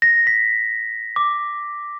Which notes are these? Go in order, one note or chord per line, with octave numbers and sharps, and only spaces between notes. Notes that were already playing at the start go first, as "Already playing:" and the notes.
A#6
B6
D6